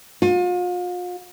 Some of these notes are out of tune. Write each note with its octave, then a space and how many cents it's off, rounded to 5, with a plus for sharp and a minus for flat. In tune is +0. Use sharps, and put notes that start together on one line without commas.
F4 +40